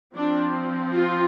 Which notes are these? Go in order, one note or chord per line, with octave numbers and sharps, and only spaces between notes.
F3 C4 D4
F4